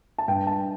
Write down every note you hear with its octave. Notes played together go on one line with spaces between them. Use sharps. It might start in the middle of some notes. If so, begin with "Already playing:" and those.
A5
G2 G5
A5